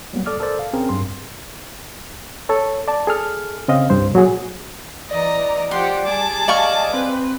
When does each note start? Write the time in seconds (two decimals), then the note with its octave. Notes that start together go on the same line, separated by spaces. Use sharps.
0.13 F#3 G3 A#3 B3
0.26 A4 D5 D6 D#6 F6
0.40 A4 A#4 C5 D5
0.59 F5
0.73 C4 C#4 G#4 A#4
0.89 G2 F#3 G3 C6
2.49 A4 C#5
2.88 D5 A5
3.07 G#4 A4 F6
3.68 C#3 C4 D#5 F5
3.90 C2 G2 C5
4.14 A#2 F#3 F#4 G#4
5.11 E3 D5 D#5 A#5
5.71 F3 G4 C5 F#5 C6
6.06 G3 G#4 A5 D6
6.48 D5 D#5 F5 C#6
6.94 C4 B4